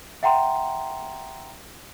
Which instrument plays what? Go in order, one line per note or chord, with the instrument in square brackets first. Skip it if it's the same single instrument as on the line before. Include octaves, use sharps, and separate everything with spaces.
[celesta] E5 F#5 G5 A#5 C6